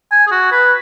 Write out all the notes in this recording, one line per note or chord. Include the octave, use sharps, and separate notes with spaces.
G#5
G#4
F#4
B4